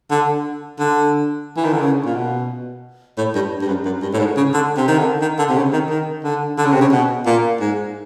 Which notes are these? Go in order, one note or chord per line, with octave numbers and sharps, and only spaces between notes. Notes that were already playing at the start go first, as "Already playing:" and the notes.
D3
D3
E3
D#3
D3
C#3
A#2
B2
A2
G2
G2
F#2
F#2
G2
A2
G#2
C#3
D3
C3
D#3
D3
D#3
D3
C3
C#3
D#3
D#3
D3
D3
C#3
C3
C#3
B2
A#2
G#2